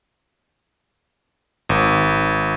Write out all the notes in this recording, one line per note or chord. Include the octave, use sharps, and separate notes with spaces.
G#1